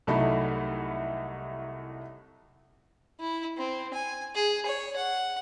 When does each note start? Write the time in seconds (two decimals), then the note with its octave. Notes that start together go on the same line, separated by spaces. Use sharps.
0.07 C2 F#3 A3 D#4 E4 B5
3.20 E4
3.57 C4
3.94 G#5
4.35 G#4
4.66 C#5
4.96 F#5